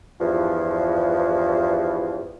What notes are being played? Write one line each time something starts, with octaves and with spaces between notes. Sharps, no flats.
E2 G2 F3